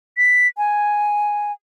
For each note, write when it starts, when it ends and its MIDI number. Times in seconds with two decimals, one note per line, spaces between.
0.17 0.48 95
0.57 1.52 80